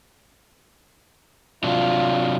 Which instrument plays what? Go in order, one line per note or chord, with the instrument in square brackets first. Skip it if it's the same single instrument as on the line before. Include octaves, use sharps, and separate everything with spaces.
[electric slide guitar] C3 F#3 D4 [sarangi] F4